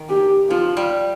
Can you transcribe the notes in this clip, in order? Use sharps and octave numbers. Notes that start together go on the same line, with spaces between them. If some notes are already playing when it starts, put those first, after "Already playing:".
Already playing: D#3
G4
F3 F4
G3